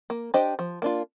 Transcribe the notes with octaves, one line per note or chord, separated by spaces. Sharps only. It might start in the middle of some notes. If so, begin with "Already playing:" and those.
A#3
D4 G4 C5 D#5
F3
A#3 D4 F4